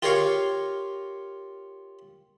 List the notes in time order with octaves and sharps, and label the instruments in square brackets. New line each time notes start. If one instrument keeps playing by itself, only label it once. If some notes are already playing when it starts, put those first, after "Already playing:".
[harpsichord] F4 G4 A#4 C#5 F5 C#6